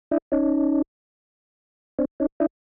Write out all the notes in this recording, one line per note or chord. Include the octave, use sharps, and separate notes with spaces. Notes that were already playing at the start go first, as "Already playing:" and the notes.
D4 E4
C#4 D#4
C4 D4
C#4 D#4
D4 E4